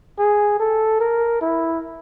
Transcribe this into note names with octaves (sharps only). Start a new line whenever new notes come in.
G#4
A4
A#4
E4